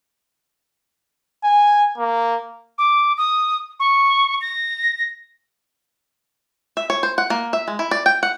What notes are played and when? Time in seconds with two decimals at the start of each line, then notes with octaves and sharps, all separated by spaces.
1.44 G#5
1.98 A#3
2.78 D6
3.17 D#6
3.80 C#6
4.41 A#6
6.77 E5
6.90 C#5
7.03 C5
7.18 F#5
7.30 A#3
7.53 E5
7.68 G#3
7.79 E4
7.91 D5
8.06 G5
8.23 F#5